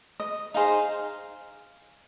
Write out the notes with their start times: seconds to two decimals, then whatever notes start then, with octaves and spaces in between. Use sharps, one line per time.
0.20 D#5
0.54 D#4 G#4 C5 F5